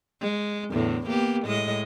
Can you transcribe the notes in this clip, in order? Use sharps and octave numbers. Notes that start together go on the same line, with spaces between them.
G#3
E2 A2 D3
A#3 B3 G4
A2 G#3 D#5